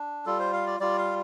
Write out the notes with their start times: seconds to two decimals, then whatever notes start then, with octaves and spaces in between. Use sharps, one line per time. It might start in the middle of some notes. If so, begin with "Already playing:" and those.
Already playing: D4
0.26 G3 F4 A4
0.39 C5
0.53 F5
0.67 D5
0.80 G3 F4 D5
0.98 F5